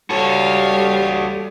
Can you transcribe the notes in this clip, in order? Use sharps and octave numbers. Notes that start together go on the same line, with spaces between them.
G3 F#4 A4 C#5 F5